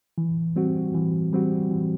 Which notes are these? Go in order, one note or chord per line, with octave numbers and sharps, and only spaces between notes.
E3
G3 C4 F#4
E3
G3 C4 F#4
E3